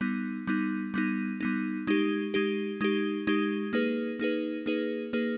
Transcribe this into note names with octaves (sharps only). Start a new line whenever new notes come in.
G3 B3 D#4
G3 B3 D#4
G3 B3 D#4
G3 B3 D#4
G#3 D#4 G4
G#3 D#4 G4
G#3 D#4 G4
G#3 D#4 G4
A#3 D#4 G#4 B4
A#3 D#4 G#4 B4
A#3 D#4 G#4 B4
A#3 D#4 G#4 B4